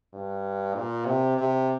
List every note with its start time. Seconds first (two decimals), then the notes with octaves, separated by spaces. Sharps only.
0.13 G2
0.74 A#2
1.06 C3
1.37 C3